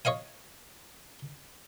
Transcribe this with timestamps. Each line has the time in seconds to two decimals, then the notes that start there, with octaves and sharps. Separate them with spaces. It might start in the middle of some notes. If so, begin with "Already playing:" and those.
0.05 C#5 D#5 F5 G#5